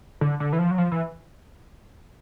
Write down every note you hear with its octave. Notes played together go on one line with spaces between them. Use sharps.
D3
D3
E3
F3
F#3
F3
E3